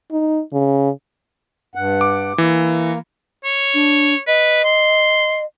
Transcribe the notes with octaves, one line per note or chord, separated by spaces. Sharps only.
D#4
C#3
G2 F#5
D6
E3 A#3
C#5
D4
B4 D#5
C6